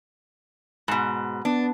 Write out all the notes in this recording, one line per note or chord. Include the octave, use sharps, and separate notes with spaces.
G#2 B2
B3 D4